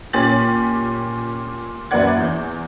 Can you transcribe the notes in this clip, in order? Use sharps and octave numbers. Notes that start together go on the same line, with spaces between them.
A#2 C#4 G4 A6 F#7
F#2 A#3 B4 D5 F#5 G#6
E2 G6